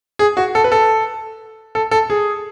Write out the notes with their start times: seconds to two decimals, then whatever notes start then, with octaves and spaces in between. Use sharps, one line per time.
0.19 G#4
0.37 F#4
0.55 A4
0.64 B4
0.72 A4
1.75 A4
1.91 A4
2.10 G#4